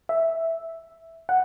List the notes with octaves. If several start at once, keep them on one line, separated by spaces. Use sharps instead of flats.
E5
F#5